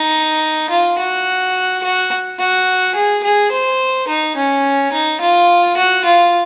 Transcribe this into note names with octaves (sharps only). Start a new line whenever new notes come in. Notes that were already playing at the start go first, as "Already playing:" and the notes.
Already playing: D#4
F4
F#4
F#4
F#4
G#4
G#4
C5
D#4
C#4
D#4
F4
F#4
F4